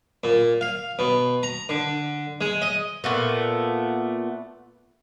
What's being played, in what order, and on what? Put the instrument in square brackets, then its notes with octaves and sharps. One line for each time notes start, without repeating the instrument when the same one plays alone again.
[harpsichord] A#2
F5
B2
A#5
D3
G#3
D#5
[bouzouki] A#2 A3 B3